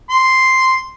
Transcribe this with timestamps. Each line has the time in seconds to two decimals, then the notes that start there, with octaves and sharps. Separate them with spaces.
0.10 C6